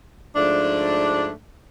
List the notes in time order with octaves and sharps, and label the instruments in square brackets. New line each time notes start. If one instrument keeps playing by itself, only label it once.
[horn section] G#2 F3 A3 D4